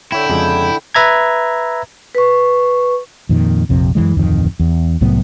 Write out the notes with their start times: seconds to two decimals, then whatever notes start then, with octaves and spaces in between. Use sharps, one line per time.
0.12 D3 E4 C#5 E5 G5
0.30 F2 C#3 G#3
0.95 B4 E5 A#5 G#6
2.15 B4 C#6
3.29 F2 A#2 D#3
3.69 A#1 F2 C3
3.95 F#2 A2 E3 G#3
4.17 D1 F2 D#3
4.59 E2
5.01 C2 A2 F#3 B3